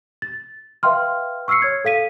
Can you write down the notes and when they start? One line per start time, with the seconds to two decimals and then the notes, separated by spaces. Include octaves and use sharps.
0.22 A6
0.83 B4 E5 F5 G5 C6 F6
1.48 C#6 E6 F6 C7 C#7
1.62 C#5 G#6
1.85 A4 F5 B6 D#7